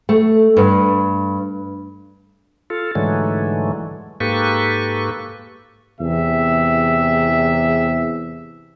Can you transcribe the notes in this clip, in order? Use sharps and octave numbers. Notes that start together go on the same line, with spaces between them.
A3
G2
F4 A4
G#2 D3 E3 F#3 G#3 A3
G#2 A#3 G4 A4 B4 C#6
E2 C3 G#4 E5